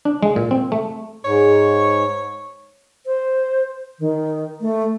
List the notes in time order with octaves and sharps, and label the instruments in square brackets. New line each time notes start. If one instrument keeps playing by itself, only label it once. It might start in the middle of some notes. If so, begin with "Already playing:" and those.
[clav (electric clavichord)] D4
G#3
A#2
C4
A3
[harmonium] G#2 [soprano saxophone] C#5
[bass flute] C5
D#3
A3